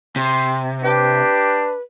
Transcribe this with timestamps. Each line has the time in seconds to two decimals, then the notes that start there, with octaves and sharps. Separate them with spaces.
0.16 C3 C6
0.83 D4 G4 B4